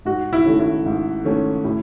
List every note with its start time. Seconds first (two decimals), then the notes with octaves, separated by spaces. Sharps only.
0.05 G#2 F#4
0.33 E4
0.45 D#3 A3 C#4
0.59 E4
0.86 G#2
1.25 D#3 A3 C#4
1.64 A2